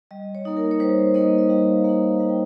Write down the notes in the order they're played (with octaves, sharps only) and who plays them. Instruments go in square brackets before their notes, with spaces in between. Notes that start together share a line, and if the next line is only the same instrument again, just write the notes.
[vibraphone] G3 D#5
C#5
A#3 D#4
A#4
C#5
G3 C5
A#3 D#4 D#5
D#5
G3 F5
A#3 D#4 F5
G3 F5
G5